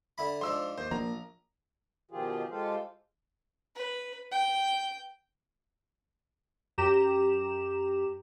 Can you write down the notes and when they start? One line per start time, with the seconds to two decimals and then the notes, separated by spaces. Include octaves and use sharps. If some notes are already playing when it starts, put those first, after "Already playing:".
0.18 D3 E4 B5
0.41 G#2 F3 D4 C6 E6
0.78 D#2 C5
0.91 A#1 F3 A#3 A#5
2.11 B2 D#3 F3 F4 G4 G#4
2.51 G#3 F4 G4 A4 C5 F5
3.75 B4
4.32 G5
6.78 F#2 G4 A#5 E7